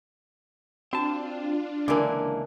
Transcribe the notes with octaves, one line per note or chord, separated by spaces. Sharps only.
C4 D4 F4 F#4 A5
C#2 D3 E3 A#3 A#4 G#5 D6